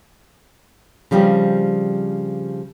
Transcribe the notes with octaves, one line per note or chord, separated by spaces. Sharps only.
C#3 F3 G3 C4 G4